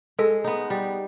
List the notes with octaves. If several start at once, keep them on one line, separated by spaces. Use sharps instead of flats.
G#3 A4
B3 D#4
G3